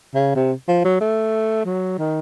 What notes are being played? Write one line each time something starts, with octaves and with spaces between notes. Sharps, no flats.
C#3
C3
F3
F#3
A3
F#3
D#3